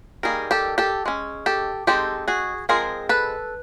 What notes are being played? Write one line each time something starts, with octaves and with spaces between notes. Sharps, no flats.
D#3 G3 A#3 G#4 A#4
G4 A4
G4 A4
G#3 C#4
G4 A4
G#3 C4 D#4 G4 A4
F#4 G#4
F3 G#3 C4 G#4 A#4
A4 B4